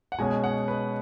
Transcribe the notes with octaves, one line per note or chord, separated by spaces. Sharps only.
F#5
B2 G#3 C#4 G#5
F#5
B4